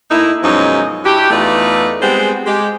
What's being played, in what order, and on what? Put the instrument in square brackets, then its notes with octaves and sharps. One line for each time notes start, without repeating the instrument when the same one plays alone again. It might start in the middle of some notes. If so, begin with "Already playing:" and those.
[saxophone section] A2 A#3 D#4 E4
F#2 B2 F3 G#3 C#4 D#4
D4 E4 F#4 G4
E2 A3 D#4 F4 B4 D5
G3 G#3 B3 C4 G#4 C5
G#3 G4